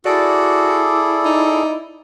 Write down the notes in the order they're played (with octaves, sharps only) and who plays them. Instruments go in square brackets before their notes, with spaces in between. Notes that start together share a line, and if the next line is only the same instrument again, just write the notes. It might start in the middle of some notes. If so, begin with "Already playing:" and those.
[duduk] E4 [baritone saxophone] F#4 [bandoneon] G#4 A4 [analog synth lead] D5
[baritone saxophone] D#4